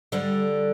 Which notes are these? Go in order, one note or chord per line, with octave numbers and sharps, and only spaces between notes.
D3 G3